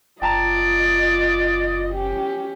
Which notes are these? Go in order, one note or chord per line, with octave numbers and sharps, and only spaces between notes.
F#1 F4 D5 D#5 G5 A5 A#5
C#4 G4